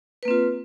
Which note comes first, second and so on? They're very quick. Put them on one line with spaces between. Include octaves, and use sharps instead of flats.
B4 A#3 C4 F4